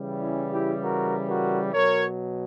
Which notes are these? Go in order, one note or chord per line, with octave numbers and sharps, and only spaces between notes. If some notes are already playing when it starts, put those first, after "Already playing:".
Already playing: C#3 E3 G3
C#4 E4
E4 G4
F#4 A#4
F#4 A#4
B2 F#3 A#4 C#5